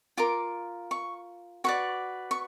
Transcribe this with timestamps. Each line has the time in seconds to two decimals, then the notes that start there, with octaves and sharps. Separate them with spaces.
0.17 F4 A#4 D6
0.91 C#6
1.64 F#4 B4 D5 C#6
2.31 C#6